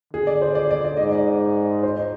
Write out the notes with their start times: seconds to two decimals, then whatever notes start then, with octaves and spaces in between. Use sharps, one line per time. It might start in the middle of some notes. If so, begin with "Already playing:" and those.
0.13 D3 G#4
0.27 D5
0.42 C5
0.55 D5
0.71 D5
0.85 D5
0.97 G#2 D#5
1.09 D5
1.83 C5
1.97 D#5